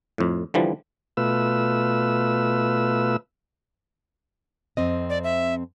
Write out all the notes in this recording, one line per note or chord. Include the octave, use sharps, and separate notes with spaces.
F2 A2
D3 E3 F3 G3
B2 A3 F4 B4 E6
F2 C4 D#5
D5
E5